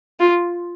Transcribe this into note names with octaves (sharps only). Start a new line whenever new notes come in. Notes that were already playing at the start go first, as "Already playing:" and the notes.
F4